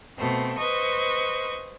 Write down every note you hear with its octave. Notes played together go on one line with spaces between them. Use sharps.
B2 A3 C4
B4 C5 D#5 C#6